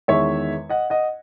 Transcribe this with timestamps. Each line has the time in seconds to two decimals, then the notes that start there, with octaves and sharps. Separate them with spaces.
0.08 E2 D#3 G#3 C#5 E5
0.69 D#5 F#5
0.90 D#5 F#5